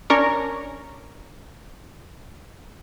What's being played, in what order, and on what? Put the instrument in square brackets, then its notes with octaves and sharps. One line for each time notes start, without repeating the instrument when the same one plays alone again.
[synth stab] C#4 D4 A#4 C#5